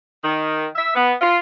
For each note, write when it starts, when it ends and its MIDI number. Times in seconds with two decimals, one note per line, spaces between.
0.24 0.66 51
0.76 0.93 76
0.95 1.12 59
1.21 1.38 65